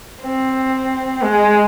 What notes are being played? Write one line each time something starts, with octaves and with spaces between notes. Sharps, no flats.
C4
G#3